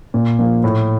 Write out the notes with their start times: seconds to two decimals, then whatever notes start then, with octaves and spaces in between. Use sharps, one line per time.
0.14 A#2
0.39 F3 A#3
0.64 A2